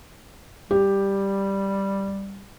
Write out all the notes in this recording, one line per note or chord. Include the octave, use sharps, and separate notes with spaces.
G3 G4